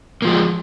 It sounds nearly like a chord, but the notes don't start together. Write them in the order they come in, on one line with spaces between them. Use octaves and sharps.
A#3 F3 G#3